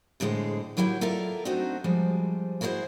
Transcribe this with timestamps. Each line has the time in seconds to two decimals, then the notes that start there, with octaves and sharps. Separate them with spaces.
0.20 E2 A2 D3 G#3 C5
0.77 D#2 F#3 E4 G4 E5 G5
1.01 F4 A4 A#4 D5 E5
1.45 A3 C4 D4 D#4 F#4
1.84 F3 G3 G#3
2.61 E4 F#4 G#4 A#4 C5